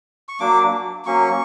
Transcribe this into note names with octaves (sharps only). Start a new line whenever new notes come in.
C#6
F#3 A#3 D4 D6
F#3 A#3 C#4 C#6